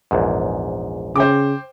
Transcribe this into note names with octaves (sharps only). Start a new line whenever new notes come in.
A#1 E2 G#2
C#3 C5 G5 D6